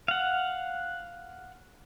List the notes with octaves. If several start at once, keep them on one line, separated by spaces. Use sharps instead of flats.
F5 F#5